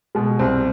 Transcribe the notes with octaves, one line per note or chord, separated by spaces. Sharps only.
B2 G#3
C2 C4